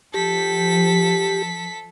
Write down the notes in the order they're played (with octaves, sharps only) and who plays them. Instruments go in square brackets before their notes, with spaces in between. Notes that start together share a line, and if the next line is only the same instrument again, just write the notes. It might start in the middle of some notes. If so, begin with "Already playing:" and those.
[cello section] F3 [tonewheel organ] G4 [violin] A4 B6